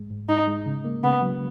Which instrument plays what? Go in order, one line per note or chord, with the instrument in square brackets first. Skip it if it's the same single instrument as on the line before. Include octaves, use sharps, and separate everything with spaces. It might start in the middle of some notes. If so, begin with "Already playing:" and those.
Already playing: [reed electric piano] G#2 G#3
G#2
[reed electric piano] G#2 [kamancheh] D#4
[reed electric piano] G#3
C#3
A#3
[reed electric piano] C#3 [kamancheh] B3
[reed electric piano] F#3